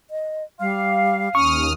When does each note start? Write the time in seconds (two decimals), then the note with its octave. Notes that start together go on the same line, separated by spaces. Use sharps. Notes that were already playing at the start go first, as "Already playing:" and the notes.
0.10 D#5
0.61 G3 F5
1.35 D#2 C#4 C#6 D#6 F6